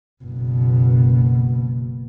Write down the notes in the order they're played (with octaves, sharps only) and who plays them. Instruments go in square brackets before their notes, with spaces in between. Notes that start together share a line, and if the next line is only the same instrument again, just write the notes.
[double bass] F#1 B2